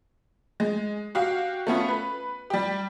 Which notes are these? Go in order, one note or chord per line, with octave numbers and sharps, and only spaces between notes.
G#3
F#4 G4 F5
A3 B3 C#4 F4
B4
G3 G4